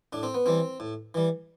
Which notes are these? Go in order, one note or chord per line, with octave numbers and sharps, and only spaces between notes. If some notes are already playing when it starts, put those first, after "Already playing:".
A2 D4
C4
B3
E3 G3 C4
A2
E3 G3